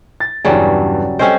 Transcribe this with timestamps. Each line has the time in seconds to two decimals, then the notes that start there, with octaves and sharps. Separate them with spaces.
0.20 A6
0.45 E2 G2 C#3 F#3 G3
1.19 G3 C4 C#4 A4 C5 D#5